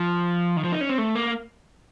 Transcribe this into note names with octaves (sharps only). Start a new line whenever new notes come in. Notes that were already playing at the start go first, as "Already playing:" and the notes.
Already playing: F3
D#3
F3
D#4
C#4
C4
A3
A#3